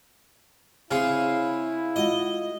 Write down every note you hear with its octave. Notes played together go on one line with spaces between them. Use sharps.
C#3 C4 E4 G#4 F5 C6
G#3 F4 F#4 D#5